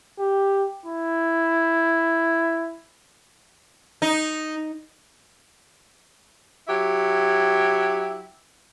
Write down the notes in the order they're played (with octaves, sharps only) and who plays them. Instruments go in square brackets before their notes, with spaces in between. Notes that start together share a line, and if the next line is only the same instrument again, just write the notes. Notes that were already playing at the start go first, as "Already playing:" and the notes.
[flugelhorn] G4
E4
[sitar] D#4
[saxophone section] F#3 E4 G4